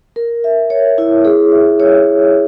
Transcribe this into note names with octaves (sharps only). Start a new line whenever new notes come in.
A#4
E5
C#5
E4
G#4
E5
C#5